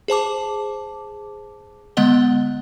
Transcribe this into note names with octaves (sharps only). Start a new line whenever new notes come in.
G#4 C5 A5 D6
D3 G#3 B3 D#5 F#5 G7